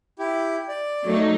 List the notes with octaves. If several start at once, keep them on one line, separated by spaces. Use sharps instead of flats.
E4 G4
D5
F#3 A3 D#4